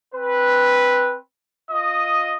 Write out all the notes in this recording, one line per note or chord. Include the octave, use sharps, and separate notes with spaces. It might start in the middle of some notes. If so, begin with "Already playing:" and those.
C4 B4
F4 D#5 D#6